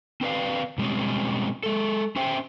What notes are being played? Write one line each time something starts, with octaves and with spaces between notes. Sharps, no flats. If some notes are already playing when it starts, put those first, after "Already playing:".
C4 B4 D5 F5
B2 G3 G#3 C4 C#4
G#3 A4
C#4 C5 E5 G5